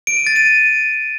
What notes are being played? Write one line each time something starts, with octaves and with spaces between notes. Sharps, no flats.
D7
D#7
A6
D#7